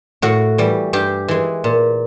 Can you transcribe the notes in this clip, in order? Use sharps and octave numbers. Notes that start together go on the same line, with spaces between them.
A2 F#4
E3 G3
G2 G4
E3 G#3
A#2